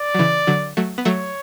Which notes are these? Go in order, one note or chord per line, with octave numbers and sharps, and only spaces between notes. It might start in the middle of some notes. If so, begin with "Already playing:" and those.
Already playing: D5
F#3
C#3 E3
D3 F#3
F#3 A3
B3
F#3 A3 C#5